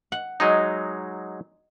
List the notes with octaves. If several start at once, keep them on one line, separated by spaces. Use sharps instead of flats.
F#5
F#3 G#3 D#4 D#5